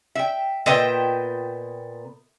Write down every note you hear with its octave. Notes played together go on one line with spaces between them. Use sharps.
E5 G5
A#2 B3 D#5 E5 G5